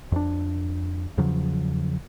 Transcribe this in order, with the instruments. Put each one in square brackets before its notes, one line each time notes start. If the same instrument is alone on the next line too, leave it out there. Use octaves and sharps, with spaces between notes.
[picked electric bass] F2 D4
E2 C#3 F3 F#3